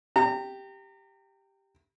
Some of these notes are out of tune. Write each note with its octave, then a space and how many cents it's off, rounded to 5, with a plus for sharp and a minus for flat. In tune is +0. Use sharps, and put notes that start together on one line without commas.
G4 +0 A#5 -35